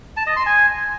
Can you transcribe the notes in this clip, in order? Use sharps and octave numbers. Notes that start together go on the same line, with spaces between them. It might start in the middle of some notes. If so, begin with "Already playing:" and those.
A5
D#5
C6
G#5